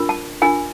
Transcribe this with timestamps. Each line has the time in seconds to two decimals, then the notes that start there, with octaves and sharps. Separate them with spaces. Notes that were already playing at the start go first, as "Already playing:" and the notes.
Already playing: D4 F4 A#4
0.09 A5
0.42 D4 F4 A#4 G#5